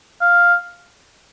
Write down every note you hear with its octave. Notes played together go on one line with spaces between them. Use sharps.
F5